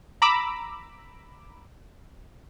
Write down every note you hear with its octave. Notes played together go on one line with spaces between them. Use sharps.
A#5 B5 D6 E6